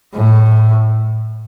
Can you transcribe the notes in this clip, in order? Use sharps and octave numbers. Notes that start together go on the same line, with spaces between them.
A2